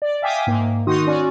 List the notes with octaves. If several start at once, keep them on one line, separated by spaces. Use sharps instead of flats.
D5
E5 F5 G5 G#5 D6 D#6
G#2 A#3
D#3 D#4 F#4 C6 D#6
C#4 F#4 D5